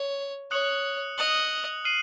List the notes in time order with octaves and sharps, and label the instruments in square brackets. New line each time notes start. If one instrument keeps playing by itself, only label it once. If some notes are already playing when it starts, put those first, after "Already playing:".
Already playing: [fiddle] C#5
[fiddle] C#5 [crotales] D#6 F#6 C#7 F#7
[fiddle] D#5 [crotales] D#6 F#6 C#7 F#7
[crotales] F6 C7 D#7 F#7